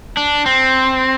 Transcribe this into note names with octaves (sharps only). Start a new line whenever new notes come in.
D4
C4